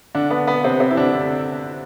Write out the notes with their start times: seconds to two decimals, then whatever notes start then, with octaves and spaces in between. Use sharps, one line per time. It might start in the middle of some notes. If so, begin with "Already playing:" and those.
0.15 D3 D4
0.30 B3
0.47 B3
0.64 C3 C4
0.80 C3 C4
0.91 E4
0.97 D3 D4